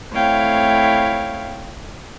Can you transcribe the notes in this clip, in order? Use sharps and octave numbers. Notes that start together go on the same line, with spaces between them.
A3 C4 E4 C#5 F5 G5